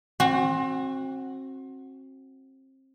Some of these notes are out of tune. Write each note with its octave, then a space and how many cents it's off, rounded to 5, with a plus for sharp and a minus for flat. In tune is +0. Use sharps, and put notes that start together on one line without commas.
C4 +30 F#4 +0